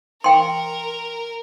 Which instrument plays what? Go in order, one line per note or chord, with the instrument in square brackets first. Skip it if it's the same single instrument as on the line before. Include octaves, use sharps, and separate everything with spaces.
[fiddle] A#4 [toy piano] G5 C6